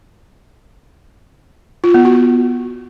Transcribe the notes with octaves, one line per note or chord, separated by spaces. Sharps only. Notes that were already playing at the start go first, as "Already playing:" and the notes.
F4
B3
F#4